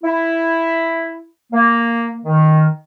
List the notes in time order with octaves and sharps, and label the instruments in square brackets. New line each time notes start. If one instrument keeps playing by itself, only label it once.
[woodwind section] E4
A#3
D#3